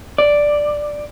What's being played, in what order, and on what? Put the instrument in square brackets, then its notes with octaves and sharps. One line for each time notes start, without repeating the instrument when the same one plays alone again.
[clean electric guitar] D5